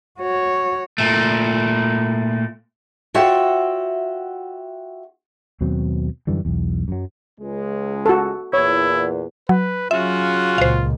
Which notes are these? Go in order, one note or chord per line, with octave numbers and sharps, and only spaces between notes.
F#4 C#5
A#2 A3
F4 F#4 C#5 E5 F#5 G5
D#2 B2 F#3 C4
F#2 D3 E3 G3
B1 E2
F#2 F#3
C#2 G#3
F#4 A4
E2 A#2 E4 C#5
F#3 B4
C#3 F#3 C#4 F4 F#4 E5
C#2 A#2 C5 F5